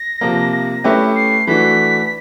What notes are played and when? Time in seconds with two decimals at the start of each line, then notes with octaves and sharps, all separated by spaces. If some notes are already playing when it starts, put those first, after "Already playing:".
Already playing: A#6
0.21 C3 F3 A#3
0.84 A3 C#4 E4 G4 B4
1.16 C7
1.47 E3 A3 D4 F#4 B6